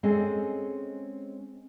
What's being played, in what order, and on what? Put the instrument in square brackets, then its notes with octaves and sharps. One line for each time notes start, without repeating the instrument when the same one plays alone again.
[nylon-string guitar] G#3 C4 C#4 G#4 A4 D#5